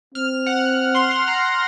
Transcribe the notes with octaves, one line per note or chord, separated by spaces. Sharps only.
C4 F6
F#5
C6
C6
A#5